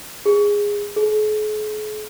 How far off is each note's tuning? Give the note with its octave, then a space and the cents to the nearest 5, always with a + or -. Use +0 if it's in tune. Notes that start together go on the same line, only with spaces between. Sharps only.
G#4 -15
G#4 +45